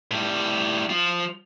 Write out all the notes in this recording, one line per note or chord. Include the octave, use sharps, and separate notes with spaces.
A2 G3
F3 F4